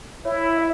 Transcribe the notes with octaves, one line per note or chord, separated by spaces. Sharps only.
E4 C#5
E5